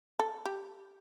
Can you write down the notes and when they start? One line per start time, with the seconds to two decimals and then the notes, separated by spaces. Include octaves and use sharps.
0.19 A4
0.45 G4